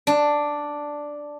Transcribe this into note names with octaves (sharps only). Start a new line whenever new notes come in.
D4